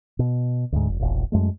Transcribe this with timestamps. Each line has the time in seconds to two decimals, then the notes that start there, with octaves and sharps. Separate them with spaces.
0.19 B2
0.72 D2 G#2
0.88 F1
1.00 E1 A#1
1.32 F#2 G#3 A3